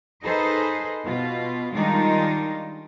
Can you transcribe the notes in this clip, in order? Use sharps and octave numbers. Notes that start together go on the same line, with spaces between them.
D#4 G#4 A4 B4 C5 D#5
B2 F4
D#3 G3 G#3 D4 D#4 F4